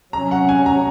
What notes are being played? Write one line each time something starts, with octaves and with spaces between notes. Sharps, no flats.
C3 F#3 C#4 A#5
F#5
G#5
A#5